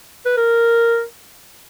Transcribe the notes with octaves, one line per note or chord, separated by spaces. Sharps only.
B4
A#4